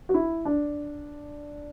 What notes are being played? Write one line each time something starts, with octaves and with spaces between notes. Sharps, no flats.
F#4
E4
D4